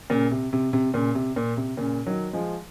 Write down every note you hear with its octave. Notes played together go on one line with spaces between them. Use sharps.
A#2 C#3
C3
C3
C3
A#2 C#3
C3
A#2
C3
A#2 C#3
D#3 F#3
F3 G#3